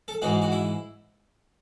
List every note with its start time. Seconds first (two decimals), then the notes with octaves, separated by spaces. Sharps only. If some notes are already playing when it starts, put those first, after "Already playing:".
0.08 A4
0.22 G#2 E3 G#3 F#4
0.42 F#4
0.52 E4